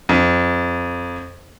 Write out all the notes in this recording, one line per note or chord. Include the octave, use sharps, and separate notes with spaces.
F2